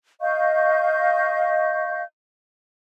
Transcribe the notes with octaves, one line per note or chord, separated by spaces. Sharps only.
D#5 F5 C#6 G6